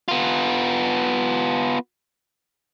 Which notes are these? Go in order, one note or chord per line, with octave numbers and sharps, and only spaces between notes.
B3 F4